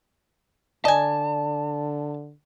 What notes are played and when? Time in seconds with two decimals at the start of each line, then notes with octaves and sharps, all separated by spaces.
0.85 D3 D5 D#5 G#5 A5